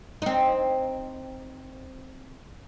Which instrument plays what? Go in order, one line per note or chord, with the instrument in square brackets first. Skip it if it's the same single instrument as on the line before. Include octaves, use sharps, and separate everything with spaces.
[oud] C4 D#4